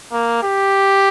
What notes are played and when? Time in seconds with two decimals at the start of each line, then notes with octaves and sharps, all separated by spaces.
0.12 A#3
0.43 G4